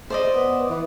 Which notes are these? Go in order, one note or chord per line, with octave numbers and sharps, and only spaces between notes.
C5 D5 D#5
B3
E3